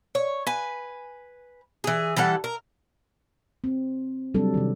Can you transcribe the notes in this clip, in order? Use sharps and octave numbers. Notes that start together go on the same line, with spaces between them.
C#5
B4 G#5
E3 G#4
E3 G3 A4 F#5
A#4
C4
C3 F#3 G3 C4 D4 A4
C3 D#3